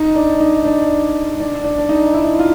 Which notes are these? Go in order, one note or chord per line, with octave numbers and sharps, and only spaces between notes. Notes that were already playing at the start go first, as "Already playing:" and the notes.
Already playing: D#4
D4
D#4
D4
D4
D4
D4
D#4
E4
F4